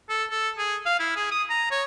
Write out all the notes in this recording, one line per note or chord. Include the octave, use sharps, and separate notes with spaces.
A4
A4
G#4
F5
E4
G#4
D#6
A#5
C#5